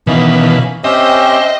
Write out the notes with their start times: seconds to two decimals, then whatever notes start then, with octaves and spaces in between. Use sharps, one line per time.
0.07 B2 D#3 E3 A#3 C#4 B4
0.84 C4 C#4 G4 C5 D#5 E5 G5